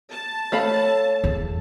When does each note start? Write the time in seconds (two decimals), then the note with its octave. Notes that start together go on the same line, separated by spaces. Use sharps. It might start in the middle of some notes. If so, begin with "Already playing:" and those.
0.10 A5
0.52 A3 C#5 F5 B5
1.24 E2